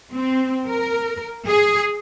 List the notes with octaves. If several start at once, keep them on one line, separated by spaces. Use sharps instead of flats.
C4
A#4
G#4